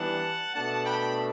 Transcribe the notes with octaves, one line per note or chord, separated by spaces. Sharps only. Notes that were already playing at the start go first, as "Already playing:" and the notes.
Already playing: E3 G3 B3 D4 F#5 A5
B2 A3 D4 F#5 A5
G5 B5